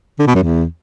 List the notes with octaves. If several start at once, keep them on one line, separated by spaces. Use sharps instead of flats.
D3
B2
F#2
E2